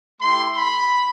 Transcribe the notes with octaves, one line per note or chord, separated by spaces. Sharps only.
A3 E4 G4 C6
B5